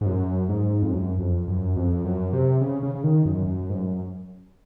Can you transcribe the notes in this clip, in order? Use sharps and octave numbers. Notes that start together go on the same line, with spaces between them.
G#2
F#2
G#2
F2
F#2
F2
F#2
F2
F#2
C3
C#3
C#3
C#3
D#3
F#2
F#2
G#2
F#2